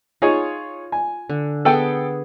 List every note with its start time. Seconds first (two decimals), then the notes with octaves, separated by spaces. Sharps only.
0.22 D#4 F4 G#4 C#5
0.92 G#5
1.29 D3
1.65 B3 G#4 A4 G5